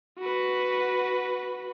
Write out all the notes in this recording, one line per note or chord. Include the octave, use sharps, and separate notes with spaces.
F#4 B4